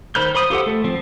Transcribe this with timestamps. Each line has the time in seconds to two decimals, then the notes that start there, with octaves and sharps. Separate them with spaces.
0.15 D#3 C5 B5 F6 G6
0.35 C5 B5 D#6
0.50 F4 G4 A4 C5 F#5
0.66 A3
0.84 F3 C4